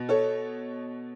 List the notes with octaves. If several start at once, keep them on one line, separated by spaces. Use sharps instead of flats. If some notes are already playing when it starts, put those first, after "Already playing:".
Already playing: B2 B3
A4 C#5